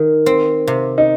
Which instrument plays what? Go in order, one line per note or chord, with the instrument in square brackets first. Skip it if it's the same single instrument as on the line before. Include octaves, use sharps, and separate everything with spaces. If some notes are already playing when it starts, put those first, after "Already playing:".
Already playing: [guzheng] D#3
C4
C3
[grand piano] D#4